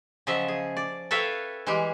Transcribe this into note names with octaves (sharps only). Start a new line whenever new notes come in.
C#3 F3 F#3 D#5 E5
G#4
D5
A4 B4 C#5 E5 F5 G5
E3 G3 G#3 G4